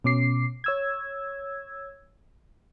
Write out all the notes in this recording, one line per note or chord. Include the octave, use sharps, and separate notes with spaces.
B2 C#4 D6 C7
C#5 E6 G#6